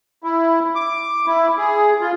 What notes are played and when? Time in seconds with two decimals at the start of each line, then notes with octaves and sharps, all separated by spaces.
0.24 E4
0.76 D6
1.27 E4
1.58 G#4
2.01 F4